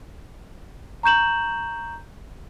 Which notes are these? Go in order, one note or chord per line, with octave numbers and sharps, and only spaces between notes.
A#5 C#6 G6 E7 F#7